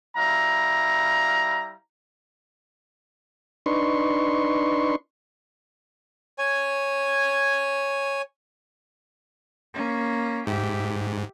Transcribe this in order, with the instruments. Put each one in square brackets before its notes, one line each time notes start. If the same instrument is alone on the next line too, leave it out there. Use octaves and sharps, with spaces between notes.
[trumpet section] G3 E4 F5 A#5
[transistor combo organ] D4 D#4 B4 C6 C#6
[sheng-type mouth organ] C#5 G#5
[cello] A#3 C#4
[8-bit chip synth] G#2 [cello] G4 E5